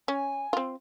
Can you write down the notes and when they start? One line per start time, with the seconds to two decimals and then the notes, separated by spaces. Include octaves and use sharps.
0.08 C#4 G#5
0.53 C4 F4